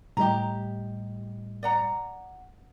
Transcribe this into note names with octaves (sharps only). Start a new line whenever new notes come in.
A2 G3 G4 D#5 A#5
D5 F#5 A#5